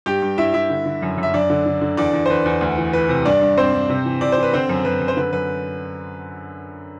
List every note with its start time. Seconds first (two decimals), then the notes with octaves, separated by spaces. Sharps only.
0.06 G2 G4 G5
0.22 G2
0.38 G2 E4 E5
0.54 G2 E4 E5
0.70 D3
0.86 D3
1.02 F#2
1.18 F#2
1.23 E5
1.34 F#2 D4 D5
1.50 D3
1.66 D3
1.81 D3
1.97 E2 D4 D5
2.13 E2
2.26 C5
2.30 E2 B4
2.46 E2
2.61 D2
2.78 E3
2.93 E3 B4
3.09 C3
3.25 G2 D4 D5
3.41 G2
3.58 G2 C4 C5
3.73 G2
3.89 C3
4.05 E3
4.21 C3 D5
4.32 E3 C5
4.43 B4
4.53 D3 C4 C5
4.69 F#2
4.85 F#2 B4
5.01 F#2
5.08 C5
5.17 D3 B4
5.33 F#2 B4